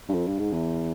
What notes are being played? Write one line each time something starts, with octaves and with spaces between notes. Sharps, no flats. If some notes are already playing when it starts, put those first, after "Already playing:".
G2
F2
G2
G#2
E2